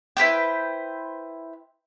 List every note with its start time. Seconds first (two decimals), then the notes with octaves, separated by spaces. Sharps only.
0.17 E4 B4 C5 G5